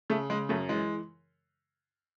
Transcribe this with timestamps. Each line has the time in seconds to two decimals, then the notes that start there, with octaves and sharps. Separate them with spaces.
0.10 C#3 A3
0.30 C#3 G#3
0.49 F#2 A3
0.69 E3 G#3